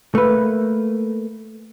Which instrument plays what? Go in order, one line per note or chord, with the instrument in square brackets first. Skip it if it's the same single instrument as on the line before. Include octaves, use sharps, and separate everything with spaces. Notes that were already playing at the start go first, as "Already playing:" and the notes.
[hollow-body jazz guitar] A3 A#3 B4